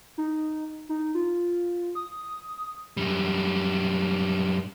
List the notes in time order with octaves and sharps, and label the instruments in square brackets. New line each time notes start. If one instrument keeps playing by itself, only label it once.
[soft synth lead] D#4
D#4
F4
D#6
[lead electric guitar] F#2 G3